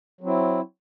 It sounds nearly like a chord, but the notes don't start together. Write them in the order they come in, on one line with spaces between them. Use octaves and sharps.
F#3 C4 E4